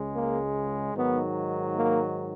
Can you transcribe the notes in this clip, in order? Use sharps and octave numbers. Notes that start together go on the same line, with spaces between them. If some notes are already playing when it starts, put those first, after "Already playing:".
Already playing: C#2 C#3 G#3
A#3
G#2 D#3 F#3 B3
A#3